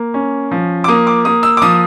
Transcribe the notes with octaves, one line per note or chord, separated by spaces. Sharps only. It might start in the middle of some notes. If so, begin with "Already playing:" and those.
Already playing: A#3
C#4
F3
D6
A#3 D#6
D6
A#3 D#6
E6
D6
F3 D#6